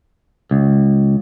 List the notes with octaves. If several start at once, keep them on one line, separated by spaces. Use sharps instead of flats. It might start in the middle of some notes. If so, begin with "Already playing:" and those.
C#2